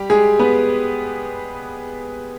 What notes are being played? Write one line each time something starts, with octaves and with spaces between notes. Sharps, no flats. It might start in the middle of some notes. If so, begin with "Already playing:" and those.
Already playing: G3 G4
G#3 G#4
B3 B4